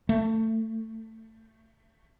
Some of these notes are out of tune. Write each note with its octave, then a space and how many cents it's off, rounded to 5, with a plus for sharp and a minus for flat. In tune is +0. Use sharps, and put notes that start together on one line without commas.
A3 +20